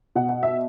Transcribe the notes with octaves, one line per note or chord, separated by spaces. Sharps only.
B2 F#5
F#5
E5